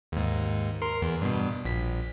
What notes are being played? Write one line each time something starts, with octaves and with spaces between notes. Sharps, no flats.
D#2 G#2
A#4 C6
E2
G2 B2
A#1 B6